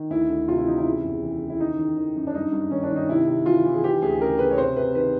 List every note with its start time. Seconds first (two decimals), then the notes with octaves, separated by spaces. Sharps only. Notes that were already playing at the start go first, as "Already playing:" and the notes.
Already playing: D#3
0.10 D2 E4
0.29 D2
0.48 C3 F4
0.58 E4
0.66 E3 D#4
0.78 E4
0.85 C#3
1.04 E2
1.22 E3
1.41 C#3
1.50 E4
1.59 D#3 D#4
1.79 D#3
1.97 D#3
2.16 F#2
2.27 D4
2.34 G2 D#4
2.52 G2
2.71 D#3 C#4
2.83 D4
2.90 D#3
2.96 D#4
3.09 C3 E4
3.27 C3
3.46 E3 F4
3.65 E3
3.74 G#4
3.84 E3 G4
4.02 D2 G#4
4.21 C#3 A#4
4.39 C#3 B4
4.51 C#5
4.58 C3 C5
4.76 C3 B4
4.95 D#3 B4